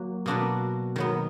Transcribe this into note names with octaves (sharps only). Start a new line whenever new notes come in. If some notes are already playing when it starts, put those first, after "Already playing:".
Already playing: F#3 A#3 F#4
B2 A#3 D4 F#4 B4
D#3 F#3 B3